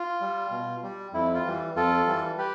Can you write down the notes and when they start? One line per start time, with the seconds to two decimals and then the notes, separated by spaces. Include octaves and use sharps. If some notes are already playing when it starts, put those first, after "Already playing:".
Already playing: F4
0.21 G3
0.51 B2
0.83 G3
1.14 F2 E4
1.34 F4
1.45 E3 G3
1.76 F2 F4 A4
2.07 E3 G3
2.38 G4 B4